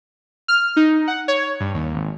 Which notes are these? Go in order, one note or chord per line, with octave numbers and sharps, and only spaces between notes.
F6
D#4
F#5
C#5
G2
D#2
G#1